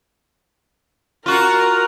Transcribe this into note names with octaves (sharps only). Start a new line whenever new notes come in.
F4 F#4 A#4